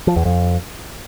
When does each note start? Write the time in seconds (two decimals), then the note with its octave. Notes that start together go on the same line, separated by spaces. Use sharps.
0.07 F3
0.16 E2
0.25 F2